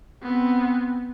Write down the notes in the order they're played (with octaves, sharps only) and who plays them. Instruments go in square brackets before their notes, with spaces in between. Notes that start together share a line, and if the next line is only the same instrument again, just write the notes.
[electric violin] B3 C4